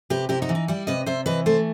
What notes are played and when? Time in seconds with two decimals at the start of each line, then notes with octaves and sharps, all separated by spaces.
0.10 C3 G4 B4
0.29 C3 E4 G4
0.42 D#4 F#4
0.49 E3
0.55 D#4
0.68 G3 E4
0.87 C3 B4 D#5
1.06 C3 C5 E5
1.26 E3 B4 D#5
1.46 A3 A4 C5